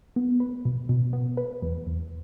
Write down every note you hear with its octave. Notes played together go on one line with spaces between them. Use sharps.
B3
B4
B2
B2
B3
B4
E2
E2